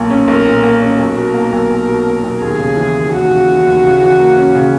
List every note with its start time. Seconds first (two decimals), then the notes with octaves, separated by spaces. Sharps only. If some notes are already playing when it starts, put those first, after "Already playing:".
Already playing: B1 A#2 A#3
0.10 C#4
0.28 B1 A#4
0.46 A#2
0.63 A#3
0.81 C#4
0.99 B1 A#4
1.16 B2
1.34 A#3
1.52 B1
1.70 B1
1.88 B2
2.06 A#3
2.23 B1
2.41 D#2 G#4
2.59 C#3
2.77 E3
2.95 D#2
3.13 D#2 F#4
3.30 C#3
3.48 E3
3.66 D#2
3.84 C#3
4.01 E3
4.19 A#3
4.37 C#4
4.55 C#3